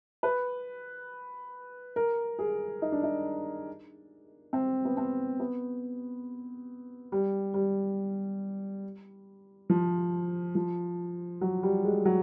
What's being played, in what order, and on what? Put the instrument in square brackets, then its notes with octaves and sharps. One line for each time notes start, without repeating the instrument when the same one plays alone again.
[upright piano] B4
A#4
G#4
D#4
D4
D#4
C4
B3
C4
B3
G3
G3
F3
F3
F#3
G3
G#3
F#3